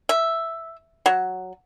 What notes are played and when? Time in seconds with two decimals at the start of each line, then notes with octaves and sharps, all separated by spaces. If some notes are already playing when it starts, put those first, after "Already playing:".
0.09 E5
1.06 F#3